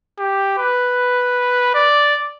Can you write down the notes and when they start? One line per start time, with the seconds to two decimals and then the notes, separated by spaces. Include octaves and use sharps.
0.19 G4
0.58 B4
1.75 D5